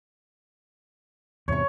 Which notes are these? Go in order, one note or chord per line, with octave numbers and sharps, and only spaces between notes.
E2 G#2 C3 C#5 C#6